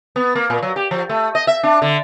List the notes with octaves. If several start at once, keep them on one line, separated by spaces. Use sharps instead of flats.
B3
A#3
A#2
F#3
G4
F3
A3
D#5
E5
D4
D3